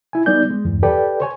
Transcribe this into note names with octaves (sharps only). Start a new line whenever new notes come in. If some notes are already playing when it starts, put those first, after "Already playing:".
E4 G#5
G3 B3 D#4 D5 G6
G#3
E2 G2
G4 A4 B4 D5 G5
C5 C#5 G#5